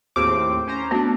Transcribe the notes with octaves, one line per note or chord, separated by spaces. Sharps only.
D#2 A2 C4 F#4 G#4 D6
C#4 C5 A#5
A3 B3 C4 D4 F#4